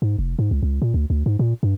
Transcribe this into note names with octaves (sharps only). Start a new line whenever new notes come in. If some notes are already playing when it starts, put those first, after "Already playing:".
G#2
F1
G#2
C#2
C#2
A#2
D2
D2
G#2
A#2
G2